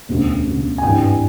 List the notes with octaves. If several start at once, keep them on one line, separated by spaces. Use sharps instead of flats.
E1 D2 C#3
E1 D2 C#3
G#5
G#1 G2 E3 G5
G#5